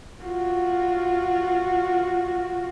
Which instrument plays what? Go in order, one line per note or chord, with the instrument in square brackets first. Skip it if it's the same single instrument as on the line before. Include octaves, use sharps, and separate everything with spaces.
[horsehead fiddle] F4 F#4